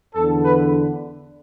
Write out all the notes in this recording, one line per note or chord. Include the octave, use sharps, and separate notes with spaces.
E2 D3 A4
B4